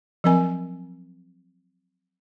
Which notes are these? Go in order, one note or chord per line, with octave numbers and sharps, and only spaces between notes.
F3 F#3 C4 A#4 G#5